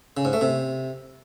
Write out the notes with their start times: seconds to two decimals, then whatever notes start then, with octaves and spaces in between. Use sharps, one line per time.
0.17 C#3
0.25 G#2
0.33 A3
0.41 C3